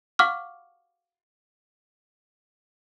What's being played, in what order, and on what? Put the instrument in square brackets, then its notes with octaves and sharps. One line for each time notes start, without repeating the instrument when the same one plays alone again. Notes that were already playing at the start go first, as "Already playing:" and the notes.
[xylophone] F5 F#5 C#6 D6 F6